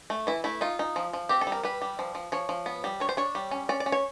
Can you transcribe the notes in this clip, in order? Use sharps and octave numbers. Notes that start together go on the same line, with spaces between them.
A3
E3 E4
A3 E4
D#4 F4
D#4
F3
F3
C4 G4
A4
G3
A#4
G3 B4
G3
F3
F3
F3 C#5
F3
B3
G3
D4 C#5
C5
D4 C#5
G3
C#4
C#4 D5
D5
C#4
C#5